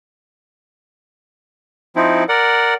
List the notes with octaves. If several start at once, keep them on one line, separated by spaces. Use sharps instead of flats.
F3 C4 D#4 E4
A#4 D5 F#5